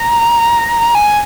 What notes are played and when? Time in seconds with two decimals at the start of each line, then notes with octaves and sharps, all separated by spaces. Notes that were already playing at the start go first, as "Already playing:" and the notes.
Already playing: A#5
0.95 G#5